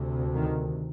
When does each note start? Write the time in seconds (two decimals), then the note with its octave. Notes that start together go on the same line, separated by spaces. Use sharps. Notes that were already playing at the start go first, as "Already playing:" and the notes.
Already playing: D2 C3
0.34 D#3